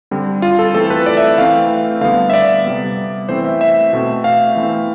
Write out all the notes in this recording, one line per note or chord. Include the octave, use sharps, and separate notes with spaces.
D3 G3 C4
F4
A4
E3 A3 C4 A4
B4
D5
E5
E3 A3 C4 F5
D3 G3 B3 F5
E5
D5
C3 G3 B3
E3 A3 C4 C5
E5
E5
B2 A3 C4
F5
E3 A3 C4